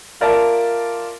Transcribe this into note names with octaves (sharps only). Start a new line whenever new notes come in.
F4 A#4 D5 E5 A5 F6